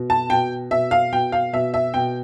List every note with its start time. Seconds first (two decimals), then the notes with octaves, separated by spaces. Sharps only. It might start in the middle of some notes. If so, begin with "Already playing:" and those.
Already playing: B2
0.10 A5
0.30 B2 G5
0.71 B2 E5
0.91 F5
1.12 B2 G5
1.32 F5
1.53 B2 E5
1.74 E5
1.94 B2 G5